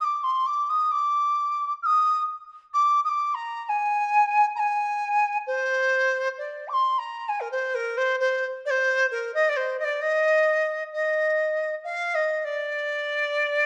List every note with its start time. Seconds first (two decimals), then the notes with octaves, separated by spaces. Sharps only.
0.01 D#6
0.04 D6
0.23 C6
0.47 D6
0.69 D#6
0.91 D6
1.82 F6
1.86 D#6
2.74 D6
3.04 D#6
3.09 D6
3.34 A#5
3.65 A#5
3.69 G#5
4.56 A#5
4.59 G#5
5.47 C5
6.38 D5
6.68 D6
6.73 C6
6.99 A#5
7.29 G#5
7.40 A#4
7.51 C5
7.75 A#4
7.97 C5
8.20 C5
8.66 D5
8.70 C5
9.11 A#4
9.34 D#5
9.49 D5
9.56 C5
9.79 D#5
9.84 D5
10.02 D#5
10.93 D#5
11.84 F5
12.15 D#5
12.45 D5